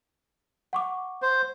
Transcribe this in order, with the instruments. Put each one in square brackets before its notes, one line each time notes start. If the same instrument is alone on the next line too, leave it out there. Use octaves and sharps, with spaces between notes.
[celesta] F#5 C#6 D6
[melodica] C5